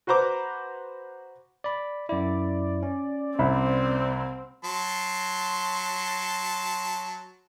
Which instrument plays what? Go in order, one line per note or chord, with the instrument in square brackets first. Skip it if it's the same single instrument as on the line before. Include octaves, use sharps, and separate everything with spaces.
[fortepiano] F#4 B4 C5 A#5 D6
[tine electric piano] D5 B5
[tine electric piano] F#2 E4 [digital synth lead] D5
[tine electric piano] C#4
[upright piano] C2 E5 B5 [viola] C4
[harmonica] F#3 A5 C6